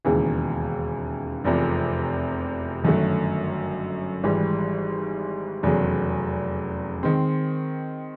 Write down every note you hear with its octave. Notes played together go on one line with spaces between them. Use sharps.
E1 D#2 C#3 E3
F1 E2 C3 F3
G1 F#2 D#3 F#3 A3
G#1 G#2 E3 G3
F1 E2 C#3 F#3
D#3 G#3 C4